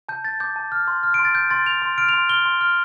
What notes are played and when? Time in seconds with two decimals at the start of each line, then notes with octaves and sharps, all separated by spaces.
0.09 A5 G6
0.25 G6 A6
0.40 D6 G6
0.56 A5
0.72 F6
0.88 C6
1.03 F6
1.14 D7
1.19 C6
1.25 A6
1.35 G6
1.50 C6 A6
1.66 G6 F7
1.82 C6
1.98 F6 D7
2.09 F7
2.14 C6
2.29 F6 G7
2.45 C6
2.61 F6